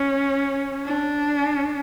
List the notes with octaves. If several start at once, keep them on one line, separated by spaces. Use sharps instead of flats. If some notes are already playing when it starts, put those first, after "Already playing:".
Already playing: C#4
D4